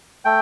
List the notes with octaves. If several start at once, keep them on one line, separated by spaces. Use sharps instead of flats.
A3 G5